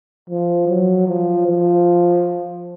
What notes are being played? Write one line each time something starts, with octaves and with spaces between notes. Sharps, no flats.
F3
F#3
F3
F3